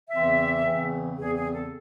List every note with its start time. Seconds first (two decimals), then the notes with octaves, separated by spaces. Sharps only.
0.10 E2 C#3 E3 C4 E5
0.64 E2 C#3 E3 C4
1.17 E2 C#3 E3 C4 G#4
1.35 G#4
1.53 A4